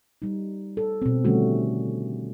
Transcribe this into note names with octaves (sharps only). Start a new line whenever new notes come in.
G3 D#4
A4
B2 C4
D3 D#3 G3 A3 C#4 F#4